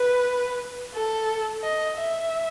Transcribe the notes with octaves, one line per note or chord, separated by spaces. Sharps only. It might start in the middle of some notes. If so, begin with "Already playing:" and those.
Already playing: B4
A4
D#5
E5